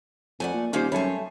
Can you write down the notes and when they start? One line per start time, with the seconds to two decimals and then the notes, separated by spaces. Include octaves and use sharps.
0.40 F2 A3 D5 F#5 G#5
0.54 A#2
0.73 D#1 A#3 C4 C#4 D#4 G4 C5
0.92 F#2 G3 A3 C4 C#5 G#5